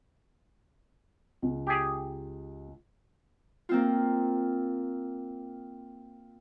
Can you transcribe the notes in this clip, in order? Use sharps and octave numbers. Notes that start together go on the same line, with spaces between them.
C#2
G4 G#4
A#3 C4 F4